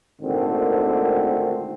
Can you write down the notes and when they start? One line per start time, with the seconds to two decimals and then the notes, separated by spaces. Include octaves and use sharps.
0.22 G#1 A#2 D3 A3 C4